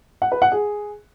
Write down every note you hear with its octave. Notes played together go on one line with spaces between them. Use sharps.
F#5
B4
F#5
G#4